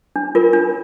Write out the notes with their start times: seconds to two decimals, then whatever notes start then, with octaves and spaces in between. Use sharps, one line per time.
0.16 D4
0.35 F4 A#4
0.53 D4